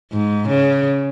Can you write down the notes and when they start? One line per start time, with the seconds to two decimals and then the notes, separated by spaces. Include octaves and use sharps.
0.12 G#2
0.49 C#3